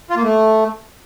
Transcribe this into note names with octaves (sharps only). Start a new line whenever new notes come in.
F4
A#3
A3